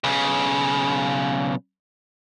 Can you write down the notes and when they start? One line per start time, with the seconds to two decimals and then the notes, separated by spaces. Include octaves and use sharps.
0.04 B1 C#3